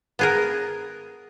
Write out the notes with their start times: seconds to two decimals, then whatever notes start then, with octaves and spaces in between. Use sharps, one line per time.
0.19 B3 G#4 A#4